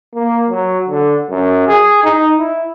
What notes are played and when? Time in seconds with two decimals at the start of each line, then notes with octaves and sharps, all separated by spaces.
0.14 A#3
0.50 F#3
0.88 D3
1.30 F#2
1.68 G#4
2.04 D#4
2.39 E4